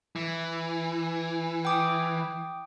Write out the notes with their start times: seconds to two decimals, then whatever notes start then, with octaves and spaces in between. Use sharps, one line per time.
0.16 E3
1.65 G5 D6 D#6